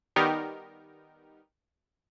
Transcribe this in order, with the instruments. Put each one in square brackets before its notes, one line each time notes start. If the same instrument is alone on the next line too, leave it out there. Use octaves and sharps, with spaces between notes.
[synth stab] D#3 G3 B3 D#4 G4 A#4